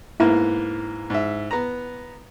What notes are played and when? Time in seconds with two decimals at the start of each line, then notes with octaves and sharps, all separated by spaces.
0.20 G#2 A#3 B3 E4
1.10 G#2 E5
1.51 B3 A#5